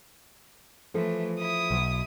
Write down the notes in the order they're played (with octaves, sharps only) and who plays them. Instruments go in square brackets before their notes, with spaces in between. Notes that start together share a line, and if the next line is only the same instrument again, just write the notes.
[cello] E3 A3 [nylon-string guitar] F3 A4
[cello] E4 [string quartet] D#6
[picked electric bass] B1